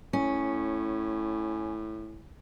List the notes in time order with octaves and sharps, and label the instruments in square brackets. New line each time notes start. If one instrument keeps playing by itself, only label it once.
[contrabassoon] A2 [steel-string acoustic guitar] C#4